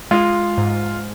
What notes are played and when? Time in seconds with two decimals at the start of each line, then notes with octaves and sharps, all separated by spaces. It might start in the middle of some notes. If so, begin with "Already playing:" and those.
0.11 G#3 F4
0.58 G#2